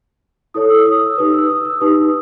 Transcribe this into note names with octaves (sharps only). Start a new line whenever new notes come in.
E4 A4 C#5 D#6
D#6
E6
D#6
E6
D#4 G4 B4 D#6
E6
D#6
E6
D#4 G4 B4 D#6